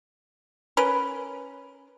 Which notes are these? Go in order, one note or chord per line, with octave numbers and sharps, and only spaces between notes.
C#4 A#4 B4